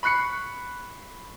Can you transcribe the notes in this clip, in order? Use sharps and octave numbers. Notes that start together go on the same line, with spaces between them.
B5 C#6 F#6 C7 C#7